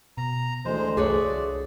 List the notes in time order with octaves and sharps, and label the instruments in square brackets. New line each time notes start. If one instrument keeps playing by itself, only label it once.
[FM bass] B2 [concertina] A#5
[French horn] D2 [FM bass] E3 [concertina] G#3 C5
[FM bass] C2 [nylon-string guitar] G#4 B4 C#5 [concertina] D5